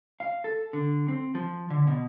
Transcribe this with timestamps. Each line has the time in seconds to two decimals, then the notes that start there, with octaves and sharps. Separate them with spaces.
0.20 F5
0.44 A4
0.73 D3
1.08 C4
1.35 F3
1.70 D3
1.87 B2